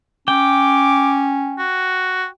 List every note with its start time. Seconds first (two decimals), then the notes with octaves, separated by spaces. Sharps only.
0.28 C#4 G5 D6
1.59 F#4